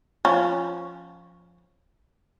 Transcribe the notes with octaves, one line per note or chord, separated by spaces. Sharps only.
F3 C#4